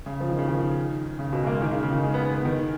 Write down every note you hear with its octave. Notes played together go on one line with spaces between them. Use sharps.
C#3
F3
D#3
C#3
D#3
C#3
B2
G#3
A#3
D#3
C#3
C#3
D#3
G#3
B3
B3
B3
D#3